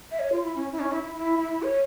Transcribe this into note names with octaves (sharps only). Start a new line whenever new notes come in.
E5
C#5
F4
E4
C#4
E4
C#4
E4
E4
E4
E4
C#5